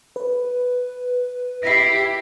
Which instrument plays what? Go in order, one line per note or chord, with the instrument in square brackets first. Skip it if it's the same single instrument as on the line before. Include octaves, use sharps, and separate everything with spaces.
[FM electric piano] B4
[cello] E4 G4 [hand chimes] A#6 C7